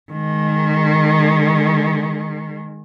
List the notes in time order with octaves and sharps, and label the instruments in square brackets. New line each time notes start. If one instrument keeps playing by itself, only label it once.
[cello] D#3 G#3